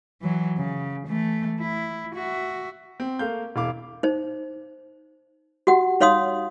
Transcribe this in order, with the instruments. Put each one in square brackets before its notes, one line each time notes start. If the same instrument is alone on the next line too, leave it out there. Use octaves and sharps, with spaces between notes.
[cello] E3 F#3
C#3
E3 A3
E4
F#4 E5
[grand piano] C4
A3 A#3 F5 G6
E1 E4 F5 D6
[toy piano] D#4 C5
F#4 G4 F#5
D#4 C#5 F5 C6 D#6